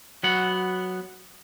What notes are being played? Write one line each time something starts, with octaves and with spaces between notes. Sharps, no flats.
F#3 B3 F#5